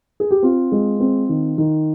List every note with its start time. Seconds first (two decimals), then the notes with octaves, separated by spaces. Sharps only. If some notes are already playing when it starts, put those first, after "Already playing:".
0.20 G#4
0.31 G4
0.43 C4 F4
0.72 G#3
1.00 C4
1.29 D#3
1.58 D#3